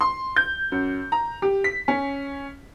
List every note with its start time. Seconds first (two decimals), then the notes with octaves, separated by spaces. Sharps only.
0.01 C6
0.36 G6
0.72 F#2
1.12 A#5
1.42 G4
1.64 B6
1.88 C#4